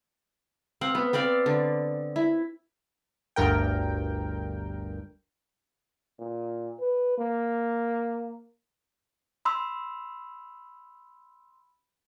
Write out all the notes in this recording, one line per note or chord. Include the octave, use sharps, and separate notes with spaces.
C4 F5 F#5
B3
B3 C4 D5 F5
D3
E4
G1 D2 G2 A#4 G5
A#2
B4
A#3
B5 C6 E6